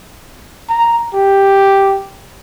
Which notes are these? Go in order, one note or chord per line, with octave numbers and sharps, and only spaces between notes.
A#5
G4